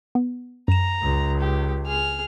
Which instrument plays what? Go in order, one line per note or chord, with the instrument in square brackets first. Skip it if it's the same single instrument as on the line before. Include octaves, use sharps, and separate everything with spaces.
[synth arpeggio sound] B3
[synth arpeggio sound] F#2 E7 [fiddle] A#5
[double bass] C#2
[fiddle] G4
G#4 F6